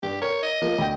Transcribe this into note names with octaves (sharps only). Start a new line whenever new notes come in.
G2 G4
A#4 C#5
D#5
F3 A#3
D2 G5